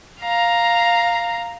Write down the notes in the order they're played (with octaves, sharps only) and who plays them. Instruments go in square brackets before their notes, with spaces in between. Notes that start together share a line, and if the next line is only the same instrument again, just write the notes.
[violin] F5 A#5